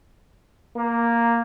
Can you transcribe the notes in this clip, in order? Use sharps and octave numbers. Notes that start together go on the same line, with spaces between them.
A#3